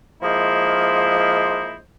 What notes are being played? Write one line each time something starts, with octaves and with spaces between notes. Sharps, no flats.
F3 G#3 A#3 E4 C5 D#5